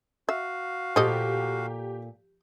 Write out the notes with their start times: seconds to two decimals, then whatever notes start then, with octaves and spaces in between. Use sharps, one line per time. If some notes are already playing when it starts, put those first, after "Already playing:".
0.29 F#4 E5 F5
0.96 A#2 F3 G4 A4 D#5